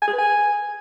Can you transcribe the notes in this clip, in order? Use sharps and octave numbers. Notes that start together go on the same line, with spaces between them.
G#5
G#4
B4
G#5